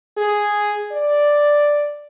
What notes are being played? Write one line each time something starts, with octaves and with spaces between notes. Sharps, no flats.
G#4
D5